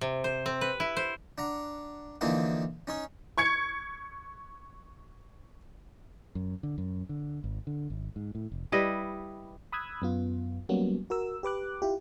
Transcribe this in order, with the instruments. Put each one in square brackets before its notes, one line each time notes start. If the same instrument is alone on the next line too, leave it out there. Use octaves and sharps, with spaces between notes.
[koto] C3
C5
C4
B4
E4
C5
[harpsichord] D4 F#5 A#5
D3 E3 F3 A#3 D#4 E4
C#4 D#4 C#5
[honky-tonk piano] C#6 G#6 C#7
[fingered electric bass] F#2
D3
F#2
D3
G#1
D3
G#1
G#2
A2
F1
[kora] G3 E4 B4 D#5
[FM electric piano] B5 D#6 E6 F#6 G#6
F#2 B3 F4
F#3 G3 A#3 B3 C#4 F#4
F#4 A#4 E6
G4 B4 D6 F#6
E4 F4 G4